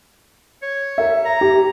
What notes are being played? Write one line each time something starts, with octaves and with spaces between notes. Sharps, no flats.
C#5
A#4 E5
A#5
G4